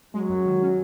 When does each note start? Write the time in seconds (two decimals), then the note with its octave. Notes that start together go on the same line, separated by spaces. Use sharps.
0.14 F#3 G#3
0.29 F#2
0.46 D#3
0.62 C#4